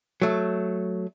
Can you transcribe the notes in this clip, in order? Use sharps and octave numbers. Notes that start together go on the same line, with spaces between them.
F#3 A3